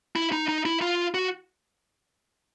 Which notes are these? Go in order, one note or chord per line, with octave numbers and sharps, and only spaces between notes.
E4
D#4
D#4
E4
F4
F#4